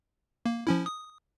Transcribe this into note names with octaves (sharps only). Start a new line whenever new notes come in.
A#3
F3 C#4 E4
D#6